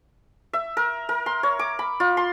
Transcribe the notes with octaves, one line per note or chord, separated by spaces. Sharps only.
E5
A#4
A#4
C6
C#5
D6
B5
F4
C6